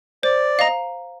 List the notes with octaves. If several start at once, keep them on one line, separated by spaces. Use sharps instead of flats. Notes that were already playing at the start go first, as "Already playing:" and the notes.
C5 D5
D#5 F5 A#5